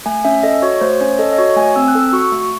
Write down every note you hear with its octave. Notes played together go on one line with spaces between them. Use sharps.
A3 G#5
C#4 E5
A4 D#5
F#4 C#5
A3 C5
C#4 C#5
A4 D#5
D#5
F#4 C#5
A3 G#5
C4 E6
F#6
A4 E6
F#4 C#6
A3